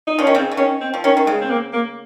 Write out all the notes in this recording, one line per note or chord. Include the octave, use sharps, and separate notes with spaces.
D#4
F3 C#4
D#3
C#3 C4
C#3
D#3 C#4
C4
F3
D#3 C#4
D#3
C#3 G#3
C4
A#3
A#3